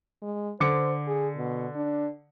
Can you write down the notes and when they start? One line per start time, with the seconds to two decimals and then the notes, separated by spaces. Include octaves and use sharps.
0.22 G#3
0.60 D3 C5 D6 C#7
1.07 G#4
1.37 B2
1.76 D4